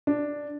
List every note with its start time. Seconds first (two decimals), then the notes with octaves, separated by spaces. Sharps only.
0.07 D4